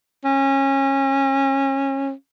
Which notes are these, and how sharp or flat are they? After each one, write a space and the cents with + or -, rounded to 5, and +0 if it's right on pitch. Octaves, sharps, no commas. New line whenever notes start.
C#4 -25